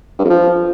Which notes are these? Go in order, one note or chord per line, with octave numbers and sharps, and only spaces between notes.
G2
F2
F3